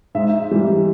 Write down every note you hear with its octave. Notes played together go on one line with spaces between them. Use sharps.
G#2 E5
E3 G3